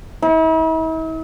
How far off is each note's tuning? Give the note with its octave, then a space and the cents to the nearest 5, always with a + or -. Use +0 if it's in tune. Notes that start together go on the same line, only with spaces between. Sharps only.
E4 -45